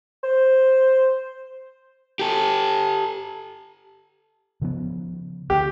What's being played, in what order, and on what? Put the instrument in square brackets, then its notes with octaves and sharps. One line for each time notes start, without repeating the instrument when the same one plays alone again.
[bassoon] C5
[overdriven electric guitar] G4 A4
[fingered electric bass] C#3 F3 B3
[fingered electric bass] D2 [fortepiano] G4